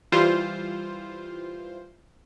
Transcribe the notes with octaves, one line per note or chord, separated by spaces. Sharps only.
E3 G3 F4 C5